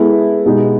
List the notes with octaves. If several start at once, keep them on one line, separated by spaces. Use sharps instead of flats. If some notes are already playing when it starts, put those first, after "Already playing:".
Already playing: G#3 B3 E4 A4
B2 G#3 B3 D#4 G4